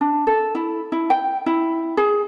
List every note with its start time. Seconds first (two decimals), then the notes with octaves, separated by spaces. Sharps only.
0.01 D4
0.27 A4
0.55 E4
0.92 E4
1.10 G5
1.46 E4
1.97 G#4